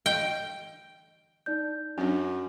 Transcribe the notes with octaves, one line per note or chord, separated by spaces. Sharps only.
D#5 G5
D#4 D5 G6
F#2 C#4 D4